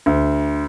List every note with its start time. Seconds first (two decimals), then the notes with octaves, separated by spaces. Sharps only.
0.06 D2